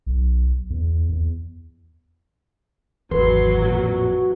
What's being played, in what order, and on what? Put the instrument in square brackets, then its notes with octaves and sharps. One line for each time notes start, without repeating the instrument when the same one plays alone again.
[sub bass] B1
E2
E2
[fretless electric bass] G#1 E2 [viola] F#3 [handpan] B4 [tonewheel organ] C6
[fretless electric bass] A1 F2 A#2 [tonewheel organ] F#4